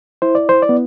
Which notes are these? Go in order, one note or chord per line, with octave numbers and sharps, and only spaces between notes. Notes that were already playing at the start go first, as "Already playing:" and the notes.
E4 C5
D5
C5
D5
B3